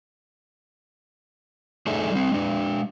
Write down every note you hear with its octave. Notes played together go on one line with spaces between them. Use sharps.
A3 D4 D#4 G#4 A4 E5
G3 C4
G#3 D4